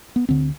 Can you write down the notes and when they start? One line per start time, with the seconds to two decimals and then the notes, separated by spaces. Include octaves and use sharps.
0.16 B3
0.29 D2 D3 C4